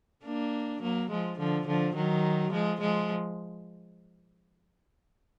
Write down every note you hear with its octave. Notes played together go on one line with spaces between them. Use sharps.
A#3 D4
F#3 A#3
F3 G#3
D3 F3
D3 F3
D#3 F#3
F3 G#3
F3 G#3